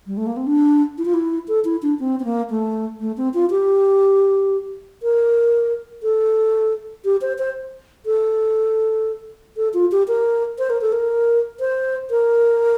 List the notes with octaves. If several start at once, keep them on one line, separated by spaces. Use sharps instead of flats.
G3
A3
A#3
C4
D4
E4
F4
E4
A4
E4
D4
C4
C4
A#3
A3
A3
C4
F4
G4
A#4
A4
G4
C5
C5
A4
A4
F4
G4
A#4
C5
A#4
A4
A#4
C5
A#4